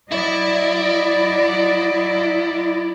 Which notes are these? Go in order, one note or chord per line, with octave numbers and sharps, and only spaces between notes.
F#3 E4 D5 D#5